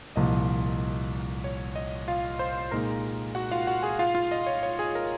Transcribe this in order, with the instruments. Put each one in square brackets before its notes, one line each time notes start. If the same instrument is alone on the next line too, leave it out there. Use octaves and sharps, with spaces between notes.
[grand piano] C2 A#2 F3 [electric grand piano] D#5
[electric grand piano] C#5
D#5
F4 F5
C5 C6
[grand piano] A#2 G#3 D#4 [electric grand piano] A#4 A#5
[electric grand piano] F#4 F#5
F4 F5
F#4 F#5
G#4 G#5
F4 F5
F4 F5
D#5
C#5
C#5
G#4 G#5
A#4 A#5